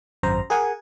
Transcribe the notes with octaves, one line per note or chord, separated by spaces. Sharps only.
G#1 F#2 C5 A#5
G#4 A#4 F#5 G#5